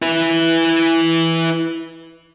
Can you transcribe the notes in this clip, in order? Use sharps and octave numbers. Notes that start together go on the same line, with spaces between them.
E4 B4